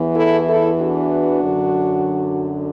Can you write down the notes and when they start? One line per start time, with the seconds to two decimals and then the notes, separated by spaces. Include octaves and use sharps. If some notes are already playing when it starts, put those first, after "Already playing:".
Already playing: E2 E3 B3
0.15 E4 A4
0.47 E4 A4
0.79 D4 F#4
1.42 F#2 D3 F#3